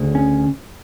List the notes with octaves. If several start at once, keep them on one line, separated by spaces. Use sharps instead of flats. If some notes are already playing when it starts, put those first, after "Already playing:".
Already playing: D2 C#3
C#4